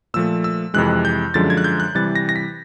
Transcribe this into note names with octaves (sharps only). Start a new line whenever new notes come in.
A#2 F3 A3 E6
E6
F2 C3 E3 G#3 F#6
G6
F#2 D3 F3 G#3 A6
G#6
F#6
G6
F#6
C3 E3 G3 A6
A#6
A#6
B6